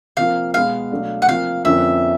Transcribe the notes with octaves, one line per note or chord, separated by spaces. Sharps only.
C3 F3 A#3 F5
B2 G#3 B3 F5
B2 F#3 A3 D4
F#5
C3 F3 A#3 F5
F2 D3 F3 A#3 C#4 E5